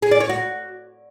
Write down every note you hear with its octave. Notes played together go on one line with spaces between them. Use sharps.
G#4
D5
C#5
F#4